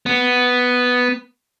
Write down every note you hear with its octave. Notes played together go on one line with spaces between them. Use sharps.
B3